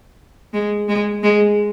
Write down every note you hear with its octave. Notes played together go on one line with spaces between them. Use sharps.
G#3
G#3
G#3